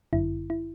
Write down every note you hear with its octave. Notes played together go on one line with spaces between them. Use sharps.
G1 F#2 D3 E4
E4